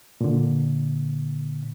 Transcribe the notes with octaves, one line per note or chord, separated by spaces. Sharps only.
A#2 D3